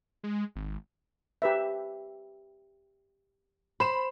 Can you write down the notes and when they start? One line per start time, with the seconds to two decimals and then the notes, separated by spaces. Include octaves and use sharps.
0.24 G#3
0.56 G#1
1.42 G4 B4 E5
3.80 C5 B5 E7